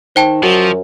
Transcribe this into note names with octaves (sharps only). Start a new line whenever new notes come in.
D#3 C5 G5 A5
F#2 F3 F#3